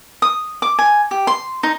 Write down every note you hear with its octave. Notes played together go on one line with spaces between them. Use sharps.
D#6
D6
G#5
G4
C6
D#4